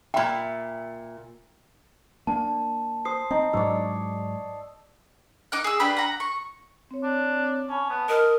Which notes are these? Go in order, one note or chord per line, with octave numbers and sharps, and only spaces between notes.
A#2 E5 G5 B5
A#3 D4 A5
C5 D#6 C7
C4 D#4
G#2 F#3 D4 C#5 D5 E6
D#4 D6 F#6
G#4 E6
D4 G4 B4 B5
F#5 A#5
C#6
C4 C#5
D4
C#4 A5 B5
B3 A5
A#4 D#5